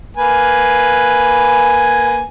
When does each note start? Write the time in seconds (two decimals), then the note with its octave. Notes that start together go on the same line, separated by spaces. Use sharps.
0.17 A#3 B4 G#5